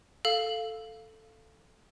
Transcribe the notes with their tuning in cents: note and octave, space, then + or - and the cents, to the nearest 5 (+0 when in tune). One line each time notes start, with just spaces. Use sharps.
A4 +0 F5 +0 E6 +0